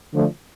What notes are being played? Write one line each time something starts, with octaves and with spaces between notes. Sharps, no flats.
D3 F3 A3